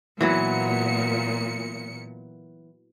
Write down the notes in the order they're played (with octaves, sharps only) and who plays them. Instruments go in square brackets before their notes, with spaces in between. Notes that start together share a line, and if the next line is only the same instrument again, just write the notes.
[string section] A#2 C#7 [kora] E3 F#3 B3